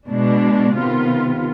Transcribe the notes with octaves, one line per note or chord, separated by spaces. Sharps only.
B2 G#3 D4
C3 D#3 B3 F4